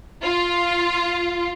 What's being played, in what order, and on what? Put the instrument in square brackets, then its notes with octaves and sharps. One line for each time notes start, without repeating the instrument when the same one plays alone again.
[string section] F4